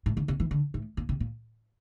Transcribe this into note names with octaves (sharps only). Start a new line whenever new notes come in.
A2
D3
C3
E3
D3
A2
A#2
C3
A#2